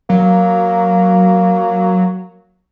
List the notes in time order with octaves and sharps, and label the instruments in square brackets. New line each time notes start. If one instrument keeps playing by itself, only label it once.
[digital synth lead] F#3 [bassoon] A#3